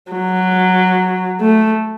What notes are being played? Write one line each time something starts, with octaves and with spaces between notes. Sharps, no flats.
F#3
A3